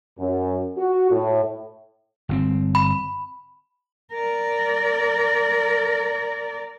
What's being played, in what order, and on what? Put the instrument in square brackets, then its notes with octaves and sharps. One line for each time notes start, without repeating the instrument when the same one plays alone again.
[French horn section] F#2
F#4
A2
[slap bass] G1 B2 C4
[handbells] B5
[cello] A#4 D5